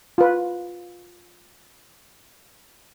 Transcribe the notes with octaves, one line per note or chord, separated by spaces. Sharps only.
F4 B4